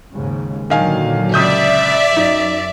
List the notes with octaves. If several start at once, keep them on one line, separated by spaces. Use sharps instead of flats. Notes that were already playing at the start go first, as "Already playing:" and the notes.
D#2 G#2 C#3
A#2 D3 D#3 F#3 F5 G#5
C#2 D5 E5 D#6 G6
F#2 D#4